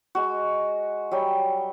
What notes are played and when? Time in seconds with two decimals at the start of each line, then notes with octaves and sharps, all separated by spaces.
0.15 G#3 F#4
1.11 F#3 G3